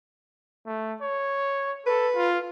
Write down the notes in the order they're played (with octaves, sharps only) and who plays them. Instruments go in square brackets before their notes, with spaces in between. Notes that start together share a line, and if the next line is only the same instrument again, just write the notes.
[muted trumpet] A3
C#5
[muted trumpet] A4 [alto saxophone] B4
[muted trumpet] F4